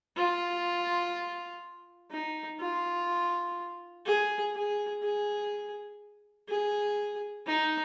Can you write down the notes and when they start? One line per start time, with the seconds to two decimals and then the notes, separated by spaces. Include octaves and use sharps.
0.17 F4
2.11 D#4
2.60 F4
4.06 G#4
4.55 G#4
5.03 G#4
6.49 G#4
7.46 D#4